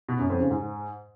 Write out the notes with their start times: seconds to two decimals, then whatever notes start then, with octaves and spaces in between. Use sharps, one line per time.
0.09 B2
0.19 F#2
0.30 F2
0.40 C#3
0.51 G#2